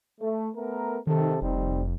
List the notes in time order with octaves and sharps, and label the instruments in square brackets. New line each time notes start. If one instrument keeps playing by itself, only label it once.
[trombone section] A3
A3 B3 A#4
[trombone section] C3 A4 [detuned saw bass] D#3
[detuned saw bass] F1 [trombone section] G3 C4 D#4